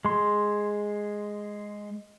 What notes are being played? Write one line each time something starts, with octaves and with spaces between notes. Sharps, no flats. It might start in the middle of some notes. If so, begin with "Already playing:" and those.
G#3 C6